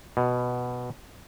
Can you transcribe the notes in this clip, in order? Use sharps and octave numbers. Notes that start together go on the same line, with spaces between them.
B2